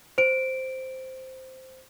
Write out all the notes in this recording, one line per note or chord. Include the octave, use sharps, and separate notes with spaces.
C5 D7